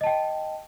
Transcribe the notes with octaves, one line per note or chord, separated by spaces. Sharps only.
D#5 G5 A5